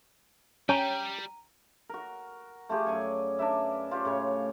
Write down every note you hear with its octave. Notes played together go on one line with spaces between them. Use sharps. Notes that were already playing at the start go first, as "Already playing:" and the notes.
G3 C#4 G5 A#5 D#7
F#4 A#4
A3 F4 G4 G#4
F#2 D5 G#5 C#6
D4 A#4 B4 E5
F4 G4 C5 C#5
A2 C#3 C#5